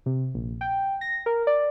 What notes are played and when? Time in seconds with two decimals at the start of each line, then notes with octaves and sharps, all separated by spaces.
0.06 C3
0.35 A#1
0.61 G5
1.01 A#6
1.26 A#4
1.47 D5